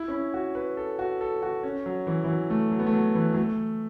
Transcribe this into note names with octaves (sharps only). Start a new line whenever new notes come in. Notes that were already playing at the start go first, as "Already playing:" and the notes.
Already playing: E4
C#4
E4
F#4
B4
A4
F#4
A4
F#4
C#4
F#3
E3
E3
F#3
A3
F#3
B3
A3
F#3
E3
F#3
A3